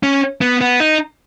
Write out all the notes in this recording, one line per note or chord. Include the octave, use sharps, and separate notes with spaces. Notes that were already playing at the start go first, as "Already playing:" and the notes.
C#4
B3
B3
D#4